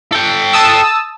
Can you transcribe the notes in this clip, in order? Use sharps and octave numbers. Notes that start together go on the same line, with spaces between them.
A4 G5
A5 D#6 E6